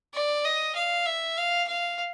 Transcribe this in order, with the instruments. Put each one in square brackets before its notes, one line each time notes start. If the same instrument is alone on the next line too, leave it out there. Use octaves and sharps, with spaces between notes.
[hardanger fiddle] D5
D#5
F5
E5
F5
F5